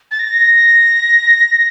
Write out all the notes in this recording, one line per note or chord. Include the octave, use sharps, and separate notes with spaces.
A6
A#6